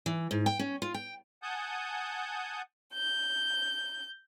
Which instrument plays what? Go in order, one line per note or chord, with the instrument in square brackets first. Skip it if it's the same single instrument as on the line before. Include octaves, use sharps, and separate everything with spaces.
[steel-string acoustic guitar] E3
G#2
G5
C#4
F4
G5
[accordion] F#5 G#5 A5 D#6 G6
[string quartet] G6